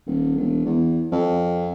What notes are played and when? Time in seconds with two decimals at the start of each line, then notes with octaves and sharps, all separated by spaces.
0.07 D#1
0.36 E1
0.65 E2
1.12 F2